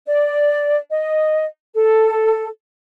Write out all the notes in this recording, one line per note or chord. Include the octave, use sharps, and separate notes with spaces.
D5
D#5
A4